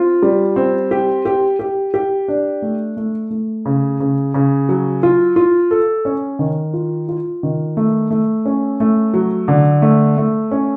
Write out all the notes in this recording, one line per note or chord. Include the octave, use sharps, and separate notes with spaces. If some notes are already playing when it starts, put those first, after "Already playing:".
Already playing: C4 F4
G3
C4
G4
G4
G4
G4
D4
A3
A3
A3
C#3
C#3
C#3
F#3
F4
F4
A4
C#4
D#3
F4
F4
D#3
A3
A3
C#4
A3
F#3
D3
A3
A3
C#4